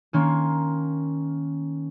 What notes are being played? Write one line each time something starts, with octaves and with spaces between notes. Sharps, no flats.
D#3 A#3 C#4 C6